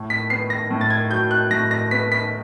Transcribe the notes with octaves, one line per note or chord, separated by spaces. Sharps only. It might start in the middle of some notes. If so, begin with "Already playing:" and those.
Already playing: A2
B6
B3 C7
A#6
A2
A6
G#6
F#3 G6
F#6
A2 A#6
A#6
B3 B6
B6